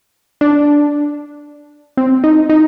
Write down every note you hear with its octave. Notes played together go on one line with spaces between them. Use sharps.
D4
C4
D#4
D#4